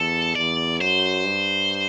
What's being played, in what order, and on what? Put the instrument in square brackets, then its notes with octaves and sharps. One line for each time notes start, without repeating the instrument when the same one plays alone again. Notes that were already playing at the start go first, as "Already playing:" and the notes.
Already playing: [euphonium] E2 [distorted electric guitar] A4
[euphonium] E2 [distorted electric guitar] D5
[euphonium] F#2 [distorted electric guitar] C5
[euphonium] G2